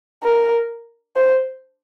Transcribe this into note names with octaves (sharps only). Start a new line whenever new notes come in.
A#4
C5